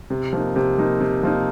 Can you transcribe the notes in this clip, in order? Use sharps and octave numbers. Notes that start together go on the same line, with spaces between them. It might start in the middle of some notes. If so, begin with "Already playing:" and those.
C3
F3 A#3 D#4
C3
F3 A#3 D#4
C3
F3 A#3 D#4